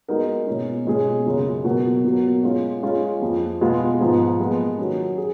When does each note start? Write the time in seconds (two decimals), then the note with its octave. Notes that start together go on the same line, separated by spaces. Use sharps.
0.08 G#3 B3 D#4 F#4 A#4
0.47 B2 G#3 C#4
0.87 B2 G#3 C#4 G#4
1.26 F#2 C#3 G#3
1.64 B2 F#3 B3 F#4 A#4
2.04 B2 F#3 A#3
2.44 G#3 C#4 F4
2.83 G#3 C#4 F4 G#4
3.21 F2 F3 G#3
3.61 B2 G#3 B3 F4 G#4
4.00 G#2 F3 B3 F4
4.40 A#2 F3 G#3 B3
4.78 D#3 F#3 C#4
5.18 G#4